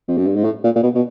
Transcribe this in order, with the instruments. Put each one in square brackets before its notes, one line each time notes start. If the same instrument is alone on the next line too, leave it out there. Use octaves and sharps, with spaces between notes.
[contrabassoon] F2
F#2
G2
G#2
A2
A#2
A#2
B2
B2